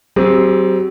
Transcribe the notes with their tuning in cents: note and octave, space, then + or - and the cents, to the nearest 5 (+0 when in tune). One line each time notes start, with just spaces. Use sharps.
F#3 +40 C4 +0 G#4 -45